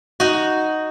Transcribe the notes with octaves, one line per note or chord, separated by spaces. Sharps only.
D#4 F#4